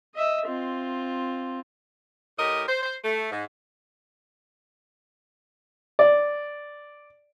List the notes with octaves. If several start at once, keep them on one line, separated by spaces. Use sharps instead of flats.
D#5 E5
C4 F4
A2 G4 A#4 D#5
C5
C5
A3
G#2
D5